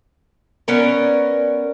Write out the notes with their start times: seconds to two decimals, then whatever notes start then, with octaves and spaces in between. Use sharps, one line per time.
0.68 B3 C#4 A#4 D5